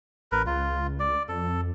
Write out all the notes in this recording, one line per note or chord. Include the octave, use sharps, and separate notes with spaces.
A1 A#4 B4
C#2 F4
D5
F2 A4